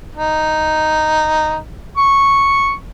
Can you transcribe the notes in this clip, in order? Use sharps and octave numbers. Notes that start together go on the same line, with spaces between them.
D#4
C#6